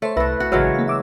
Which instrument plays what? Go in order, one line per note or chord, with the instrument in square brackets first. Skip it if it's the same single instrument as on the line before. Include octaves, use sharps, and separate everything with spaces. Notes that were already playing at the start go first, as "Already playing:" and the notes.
[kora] A3 [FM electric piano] C5 C#5
[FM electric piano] C2 E5 A#6 [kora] E4 A4 [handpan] B4
[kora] F#4 [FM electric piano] F#6
[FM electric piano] A1 E6 F6 [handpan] C#3 C#5 [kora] E3 F#3 G#3
[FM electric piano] A#3 F5
E5 D6 E6